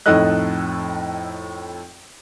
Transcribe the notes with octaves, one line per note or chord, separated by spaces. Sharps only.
F2 A2 D#4 A4 D#5 F#6